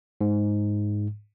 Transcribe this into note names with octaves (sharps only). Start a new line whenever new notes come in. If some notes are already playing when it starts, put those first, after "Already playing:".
G#2